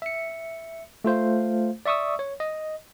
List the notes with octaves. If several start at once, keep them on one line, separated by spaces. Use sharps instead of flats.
E5 C#7
A3 F4 C5 F5
D5 E5 C#6 D#6 E6
C#5
D#5